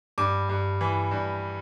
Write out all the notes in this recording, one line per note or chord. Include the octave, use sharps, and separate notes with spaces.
G2 D6
G2
E3
G2